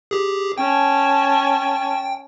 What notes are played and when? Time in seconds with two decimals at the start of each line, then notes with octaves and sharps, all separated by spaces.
0.11 G4 G#4
0.58 C#4 G5 A5